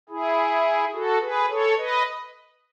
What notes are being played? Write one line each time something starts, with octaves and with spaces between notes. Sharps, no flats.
E4 G#4
F#4 A4
G#4 B4
A4 C#5
B4 D#5